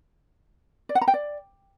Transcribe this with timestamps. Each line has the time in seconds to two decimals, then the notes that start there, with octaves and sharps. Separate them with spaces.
0.89 D5
0.95 F#5
1.01 A#5
1.08 G5
1.14 D5